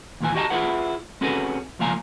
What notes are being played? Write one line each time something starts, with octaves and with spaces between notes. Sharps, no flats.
D#2 A#2 E3 G#5
F#4 G4 D#5 G5 A5 A#5
E4 F4 G#4 B4 F#5
C4 C#4 F#4 G#4 A4 B4
C#2 F3 A#3 F5 G#5 A#5